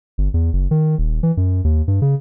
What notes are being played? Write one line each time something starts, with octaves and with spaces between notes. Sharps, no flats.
G1
E2
F#1
D#3
D#1
E3
F#2
D#2
G2
C#3